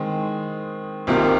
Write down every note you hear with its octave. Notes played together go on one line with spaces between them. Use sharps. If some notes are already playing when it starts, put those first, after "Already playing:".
Already playing: D#3 G#3 C4
C2 C3 D#3 A#3 F4